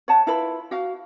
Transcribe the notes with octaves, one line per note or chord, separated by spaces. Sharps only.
C#5 F#5 A5
E4 F4 B4 B5
F#4 F5